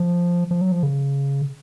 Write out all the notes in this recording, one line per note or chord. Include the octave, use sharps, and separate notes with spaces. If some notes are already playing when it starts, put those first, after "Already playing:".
Already playing: F3
F3
F#3
F3
C#3